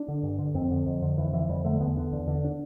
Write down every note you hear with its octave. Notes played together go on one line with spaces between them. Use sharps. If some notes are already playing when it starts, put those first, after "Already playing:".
Already playing: D4
D3
G2
D3
F2 C4
D3
F2
D3
F2 E3
D3 E3
F2 G3
D3 A3
E2 B3
D3
E2
D3
D4